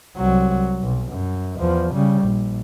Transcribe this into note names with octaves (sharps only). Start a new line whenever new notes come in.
C2 F#3
B1
F#2
E2 F3
C#3 G3
A#1